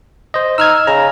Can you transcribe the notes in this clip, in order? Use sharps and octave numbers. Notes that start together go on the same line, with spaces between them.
C5 D#5
D#4 E6 F6 G#6
C#3 A#5